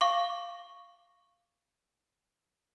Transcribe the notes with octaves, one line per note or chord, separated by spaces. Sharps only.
F5 C#6 D6